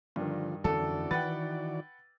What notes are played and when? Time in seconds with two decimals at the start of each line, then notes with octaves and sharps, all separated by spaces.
0.16 G2 D3 D#3 F3
0.64 F2 D3 E3 C#4 F#4 A4 D5
1.11 D#3 B4 F#5 G5 A6